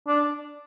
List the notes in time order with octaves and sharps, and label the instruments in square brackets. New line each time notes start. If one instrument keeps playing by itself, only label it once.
[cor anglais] D4